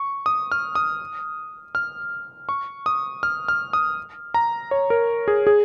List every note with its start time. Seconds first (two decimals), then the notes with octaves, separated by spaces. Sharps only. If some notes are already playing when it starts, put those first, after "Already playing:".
Already playing: C#6
0.26 D#6
0.52 F6
0.75 D#6
1.75 F6
2.49 C#6
2.86 D#6
3.23 F6
3.48 F6
3.73 D#6
4.34 A#5
4.71 C#5
4.90 A#4
5.28 G#4
5.47 G#4